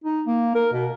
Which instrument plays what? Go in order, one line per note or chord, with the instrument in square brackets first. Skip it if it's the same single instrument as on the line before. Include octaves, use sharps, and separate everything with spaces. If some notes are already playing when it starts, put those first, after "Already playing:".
[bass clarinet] D#4
A#3
A#4
B2